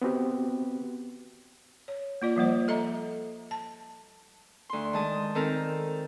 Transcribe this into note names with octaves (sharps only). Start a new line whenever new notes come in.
B3 C4 F#4 G4
C#5
A#3 F4 D5
F3 G3 A#3 C5
A4 D#5 E5 A#5
A5
D2 C6
D#3 G#3 A5 D#6
D#3 C4 A4 A#4